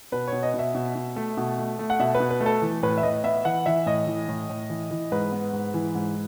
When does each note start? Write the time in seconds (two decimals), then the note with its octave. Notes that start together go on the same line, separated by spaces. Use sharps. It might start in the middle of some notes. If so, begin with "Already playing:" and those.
0.12 B2 B4
0.28 B2 C#5
0.43 D#5
0.54 B2 E5
0.75 B2
0.95 B2
1.16 A3
1.37 B2
1.58 A3
1.79 A3
1.90 F#5
1.99 B2 E5
2.15 B4
2.20 B2
2.30 B4
2.41 A3
2.46 A4
2.62 E3
2.83 A2 B4
2.98 E5
3.03 A2 D#5
3.24 B3 E5
3.45 E3 F#5
3.66 E3 E5
3.86 A2 D#5
4.07 E3
4.28 A2
4.50 A2
4.70 E3
4.91 E3
5.12 G#2 B4
5.32 B3
5.53 G#2
5.74 E3
5.95 G#2